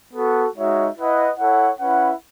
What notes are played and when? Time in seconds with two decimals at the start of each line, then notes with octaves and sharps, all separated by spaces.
0.14 B3 F#4 A4
0.56 G#3 D#4 F#4 C#5 E5
0.98 E4 B4 D#5 F#5
1.38 E4 A4 C#5 F#5
1.79 C#4 E4 B4 F#5